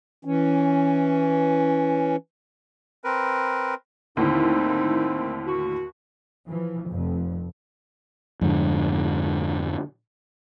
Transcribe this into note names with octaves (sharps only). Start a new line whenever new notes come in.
E3 C#4
C4 A#4 B4
D#2 A2 D3 C4 D#4 E4
F#4
E3 F3
F1 F2
F2 G#2 D3